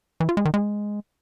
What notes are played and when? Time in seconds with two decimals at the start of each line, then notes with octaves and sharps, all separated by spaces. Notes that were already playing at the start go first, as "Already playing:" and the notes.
0.20 E3
0.29 F4
0.37 G#3
0.45 D#3
0.54 G#3